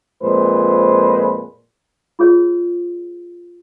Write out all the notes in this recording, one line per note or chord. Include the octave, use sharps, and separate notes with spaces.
F2 A#2 G#3 B4 C5
F4 G#4 C#5